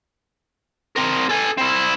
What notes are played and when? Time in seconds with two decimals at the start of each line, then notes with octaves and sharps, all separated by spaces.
0.96 C4 A#4
1.29 A4 G#5
1.57 C4 E4